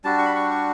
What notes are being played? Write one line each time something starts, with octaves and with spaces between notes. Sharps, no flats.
G3 D4 F#4 A5
C#6
B5
C#6
C#6